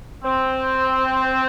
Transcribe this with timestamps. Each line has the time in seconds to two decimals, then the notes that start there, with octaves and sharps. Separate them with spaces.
0.24 C4